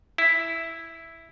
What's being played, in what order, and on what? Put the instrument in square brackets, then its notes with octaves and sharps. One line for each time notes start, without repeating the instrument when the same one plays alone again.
[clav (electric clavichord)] E4